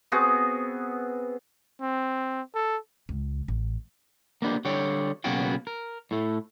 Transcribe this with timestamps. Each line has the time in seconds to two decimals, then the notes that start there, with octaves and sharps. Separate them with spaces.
0.12 B3 C4 F#4 G#4
1.81 C4
2.55 A4
3.09 C#2
3.48 A1
4.42 A#3 B3 D4 G4
4.65 D3 G3 C#5 G5
5.24 B1 C#3 A#3 B3 F#4 G5
5.67 A#4
6.11 A2 A3